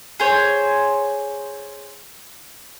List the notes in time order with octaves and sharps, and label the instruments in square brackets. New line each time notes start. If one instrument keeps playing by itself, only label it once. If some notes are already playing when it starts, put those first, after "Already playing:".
[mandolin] G#4 C5 C#5